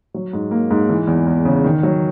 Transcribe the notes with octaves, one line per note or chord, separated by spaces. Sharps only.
F#3
G#2
A#3
G#2
E3
E2
E2
C#3
D#3
F#3